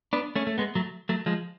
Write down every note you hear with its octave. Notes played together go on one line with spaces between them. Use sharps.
B3 D4
A3 C#4
A3
G#3 B3
F#3 A3
F#3 A3
F3 G#3